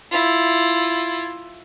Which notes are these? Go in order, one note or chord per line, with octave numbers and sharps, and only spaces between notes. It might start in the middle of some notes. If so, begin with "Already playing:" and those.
E4 F4